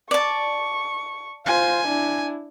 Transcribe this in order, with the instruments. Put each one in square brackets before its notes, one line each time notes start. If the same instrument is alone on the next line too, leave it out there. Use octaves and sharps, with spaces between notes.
[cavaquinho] D5 A5 [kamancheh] C#6
[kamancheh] F4 C5 [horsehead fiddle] G#5
[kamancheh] D4 E4